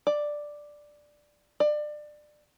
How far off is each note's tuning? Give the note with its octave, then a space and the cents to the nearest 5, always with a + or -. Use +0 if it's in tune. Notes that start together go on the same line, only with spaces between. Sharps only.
D5 +5
D5 +25